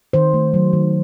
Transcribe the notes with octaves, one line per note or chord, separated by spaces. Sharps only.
D#3 C5
A3
F#3
D#3